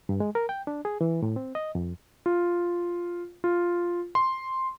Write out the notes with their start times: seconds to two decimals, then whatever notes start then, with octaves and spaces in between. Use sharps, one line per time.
0.09 G2
0.20 G#3
0.35 A#4
0.49 G5
0.67 D4
0.85 G#4
1.01 E3
1.22 A2
1.36 C4
1.55 D#5
1.75 F2
2.26 F4
3.44 F4
4.15 C6